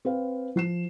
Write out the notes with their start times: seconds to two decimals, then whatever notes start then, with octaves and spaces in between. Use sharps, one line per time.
0.05 C4 B4 F5
0.56 F3 C7 E7